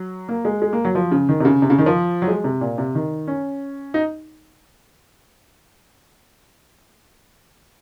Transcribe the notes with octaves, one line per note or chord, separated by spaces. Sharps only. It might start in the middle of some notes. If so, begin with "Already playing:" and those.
Already playing: F#3
A#3
G#3
G#3
A#3
F#3
F3
C#3
D#3
C3
C#3
C3
C#3
D#3
F3
F#3
G#3
C3
A#2
C3
D#3
C#4
D#4